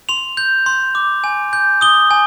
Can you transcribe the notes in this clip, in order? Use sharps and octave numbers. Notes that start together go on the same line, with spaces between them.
C6 F7
G6
C6
D6
G#5
G6
D#6 G7
G#5